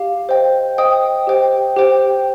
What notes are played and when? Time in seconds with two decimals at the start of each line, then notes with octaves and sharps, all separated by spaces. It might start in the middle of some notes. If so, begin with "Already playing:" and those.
Already playing: G4 F5
0.29 C5 D#5 G5
0.78 C5 D#5 G5 D#6
1.27 G4 C5 G5
1.77 G4 C5 G5